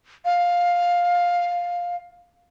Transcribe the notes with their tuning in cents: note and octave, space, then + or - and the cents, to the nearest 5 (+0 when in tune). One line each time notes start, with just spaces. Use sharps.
F5 +10